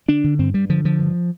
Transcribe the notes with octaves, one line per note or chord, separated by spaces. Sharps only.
D3 D4
D3
G2 C4
G2 G3
D3 F3
D3 F3
G2